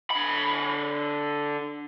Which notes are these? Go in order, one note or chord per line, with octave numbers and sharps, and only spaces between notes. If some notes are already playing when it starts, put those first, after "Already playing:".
D3 B5